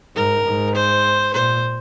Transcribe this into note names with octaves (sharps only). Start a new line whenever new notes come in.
G#2 A#4
G#2
C5
A#2 C5